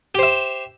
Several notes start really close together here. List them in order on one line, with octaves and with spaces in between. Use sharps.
G4 C5 E5